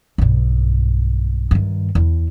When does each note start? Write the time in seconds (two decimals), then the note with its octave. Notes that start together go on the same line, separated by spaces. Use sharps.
0.18 B1 G2
1.51 G2 D#3
1.95 E2